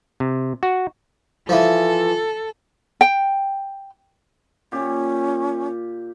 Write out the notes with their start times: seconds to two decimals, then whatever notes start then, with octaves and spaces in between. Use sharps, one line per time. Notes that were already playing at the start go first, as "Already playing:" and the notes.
0.20 C3
0.63 F#4
1.49 E3 F3 A4
3.01 G5
4.72 A#2 C#4 G4